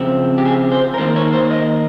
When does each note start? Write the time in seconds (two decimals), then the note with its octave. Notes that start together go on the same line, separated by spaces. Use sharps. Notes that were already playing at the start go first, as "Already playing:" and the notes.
Already playing: C#3 F3 C4
0.38 G4
0.45 G#4
0.72 C5
0.94 A#4
0.98 D#3 A#3 C5
1.16 C#5
1.33 C5
1.51 D#5